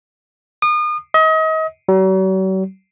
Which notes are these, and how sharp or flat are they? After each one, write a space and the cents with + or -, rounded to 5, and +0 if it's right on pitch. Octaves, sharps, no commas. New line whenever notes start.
D#6 -35
D#5 +35
F#3 +45